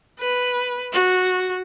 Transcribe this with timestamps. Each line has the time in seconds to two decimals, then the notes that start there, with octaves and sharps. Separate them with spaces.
0.20 B4
0.93 F#4